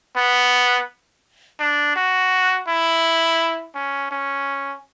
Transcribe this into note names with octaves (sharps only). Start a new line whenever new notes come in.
B3
D4
F#4
E4
C#4
C#4